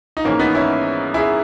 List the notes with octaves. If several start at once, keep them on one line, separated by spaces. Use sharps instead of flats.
D#4
G#1 G#2 E3 A#3 C#4
B3 D#4
C#4 E4
E4 G#4